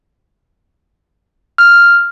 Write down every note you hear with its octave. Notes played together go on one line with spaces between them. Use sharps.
F6